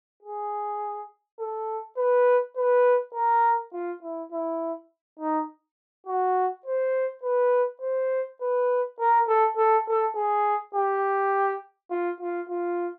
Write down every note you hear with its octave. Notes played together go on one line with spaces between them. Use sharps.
G#4
A4
B4
B4
A#4
F4
E4
E4
D#4
F#4
C5
B4
C5
B4
A#4
A4
A4
A4
G#4
G4
F4
F4
F4